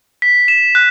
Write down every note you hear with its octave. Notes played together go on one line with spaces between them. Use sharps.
B6
E7
F#6